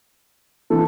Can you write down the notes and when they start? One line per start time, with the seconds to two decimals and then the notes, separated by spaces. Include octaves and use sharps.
0.70 E3 A4